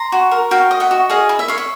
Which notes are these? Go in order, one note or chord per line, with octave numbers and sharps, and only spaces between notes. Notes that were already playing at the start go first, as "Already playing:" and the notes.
Already playing: A#5 C6
F#4
A#4
F#4 F5 G5
D#5
E5 F#5
F#4
G#4 D#5 F5
E4
E5
C#5 F5
E5